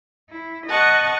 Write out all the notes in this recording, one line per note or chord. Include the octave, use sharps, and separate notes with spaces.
E4
D#5 F#5 A5 C#6